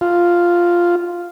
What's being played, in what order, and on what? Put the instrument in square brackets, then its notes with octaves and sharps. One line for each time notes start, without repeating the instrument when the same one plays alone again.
[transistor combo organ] F4